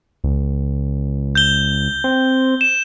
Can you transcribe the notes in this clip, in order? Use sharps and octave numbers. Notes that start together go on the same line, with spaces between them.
C#2
G6 G7
C4
E7